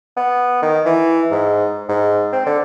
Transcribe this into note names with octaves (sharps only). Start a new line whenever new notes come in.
B3
D#3
E3
G#2
G#2
C4
D3